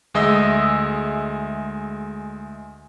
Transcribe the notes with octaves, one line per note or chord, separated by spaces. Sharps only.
D2 G#3 D#5 E5 D#6 E6